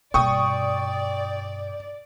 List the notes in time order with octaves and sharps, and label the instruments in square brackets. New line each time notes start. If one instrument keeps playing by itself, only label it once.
[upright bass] G2 B2 [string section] D5 [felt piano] G5 [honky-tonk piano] C#6 D#6